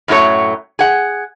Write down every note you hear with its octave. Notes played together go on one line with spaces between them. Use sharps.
F#2 A2 F#3 A3 C#5
G#4 F#5